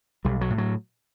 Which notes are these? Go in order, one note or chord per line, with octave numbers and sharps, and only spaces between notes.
B1 G3
F#3
A2
F#3